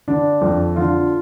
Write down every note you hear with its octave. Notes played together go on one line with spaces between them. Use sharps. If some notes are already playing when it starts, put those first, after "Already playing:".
D3 D4
F2
D3 F4